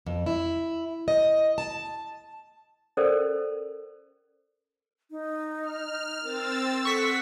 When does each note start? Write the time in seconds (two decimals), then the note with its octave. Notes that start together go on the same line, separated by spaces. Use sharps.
0.07 F2
0.26 E4
1.08 D#5
1.58 A5
2.97 C#4 A4 A#4 C5 D5
5.11 D#4
5.62 F6
6.24 C4 A#4 E6 A6
6.85 A4 F#5 C#6 B6